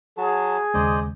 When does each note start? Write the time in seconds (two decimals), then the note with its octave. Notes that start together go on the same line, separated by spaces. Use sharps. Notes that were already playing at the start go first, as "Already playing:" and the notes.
0.18 F#3 F#4 G#4 A5
0.74 D#2 C#3 G#3 C5 D5 D#5